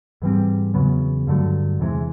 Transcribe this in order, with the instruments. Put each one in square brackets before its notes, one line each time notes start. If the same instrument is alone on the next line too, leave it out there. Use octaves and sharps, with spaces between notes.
[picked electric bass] G#2 E3 G3 C4
E2 C#3 F#3 B3
G2 D3 F#3 A3
E2 C3 E3 G#3